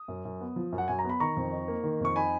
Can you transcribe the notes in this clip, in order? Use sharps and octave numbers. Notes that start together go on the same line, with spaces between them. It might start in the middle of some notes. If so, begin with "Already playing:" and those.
Already playing: D#6
F#2
F#2
B3
F3
F#2
F#5
F#2 G#5
A#5
B3
B5
D#3 A#5 C#6
F2
D#4
A#3
D#3
F2 C#6
D#4 G#5 B5